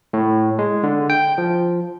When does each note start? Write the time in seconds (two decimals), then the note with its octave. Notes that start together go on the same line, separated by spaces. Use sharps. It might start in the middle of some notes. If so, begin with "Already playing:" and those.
0.13 A2
0.59 G#3
0.83 D3
1.10 G5
1.38 F3